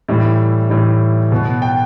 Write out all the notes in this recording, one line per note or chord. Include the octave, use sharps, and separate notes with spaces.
A2 E3 G3
A2 E3 G3
B2 B3
G5